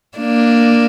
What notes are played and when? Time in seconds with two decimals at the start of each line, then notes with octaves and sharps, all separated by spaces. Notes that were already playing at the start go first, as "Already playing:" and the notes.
0.18 A#3 D4